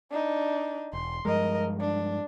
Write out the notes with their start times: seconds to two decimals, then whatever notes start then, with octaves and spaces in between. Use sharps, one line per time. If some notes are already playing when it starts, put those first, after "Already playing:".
0.11 D4 D#4
0.93 E1 C6
1.25 G2 F3 G#3 A#4 D#5
1.80 D4